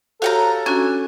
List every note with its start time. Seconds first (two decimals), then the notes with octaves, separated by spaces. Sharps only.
0.22 F#4 G4 A4 C#5 F5 F#5 A#5
0.66 C#4 D4 F#4 G#5